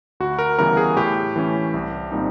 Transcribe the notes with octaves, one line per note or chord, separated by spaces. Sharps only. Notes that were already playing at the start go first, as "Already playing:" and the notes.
D2 F#4
A#4
C#3 E3 G3 B3 A#4
G#4
A2 G4
E3 A3 C#4
C2
A#2 G3 C4 D#4